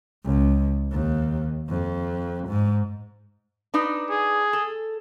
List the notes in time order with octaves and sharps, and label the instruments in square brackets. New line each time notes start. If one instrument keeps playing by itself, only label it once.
[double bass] C#2
D#2
F2
G#2
[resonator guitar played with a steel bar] D4 D#4 B4
[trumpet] G#4
[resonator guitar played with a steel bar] A4